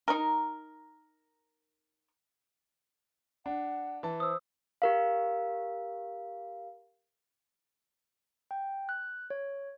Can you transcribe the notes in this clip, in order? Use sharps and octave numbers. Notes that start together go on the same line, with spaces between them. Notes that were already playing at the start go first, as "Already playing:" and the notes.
D#4 A#4
D4 F#5
E3 A5
C5 D#6 E6
G4 A#4 F5
G5
F#6
C#5